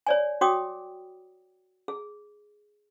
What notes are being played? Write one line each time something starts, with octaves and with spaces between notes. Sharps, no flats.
C#5 D5 G#5
F#4 C#5 G5 D6 D#6
G#4